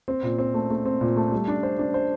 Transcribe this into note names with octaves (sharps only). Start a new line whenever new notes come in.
C4
A#2
C4
A3
A3
C4
A#2
A3
G3
D4
C5
D4
C5